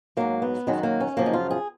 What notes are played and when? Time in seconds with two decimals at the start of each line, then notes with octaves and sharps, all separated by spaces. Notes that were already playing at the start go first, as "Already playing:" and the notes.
0.17 G#2 F#3 A#3
0.42 B3
0.67 F#2 D#3 F#3 G#3
0.83 A#3
1.00 C#4
1.17 F#2 C#3 F3 A#3
1.26 D#4
1.33 F4
1.51 G#4